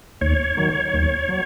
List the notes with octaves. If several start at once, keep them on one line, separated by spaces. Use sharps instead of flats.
D#2 C#5
D#3 F#3
D#2
F#3